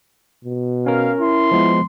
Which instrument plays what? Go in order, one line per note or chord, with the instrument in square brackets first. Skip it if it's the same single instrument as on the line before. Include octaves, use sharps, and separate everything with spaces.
[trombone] B2
[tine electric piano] C#4 A#4 [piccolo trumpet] F5
[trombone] E4 [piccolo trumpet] C6
[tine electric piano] F3 G#3 B3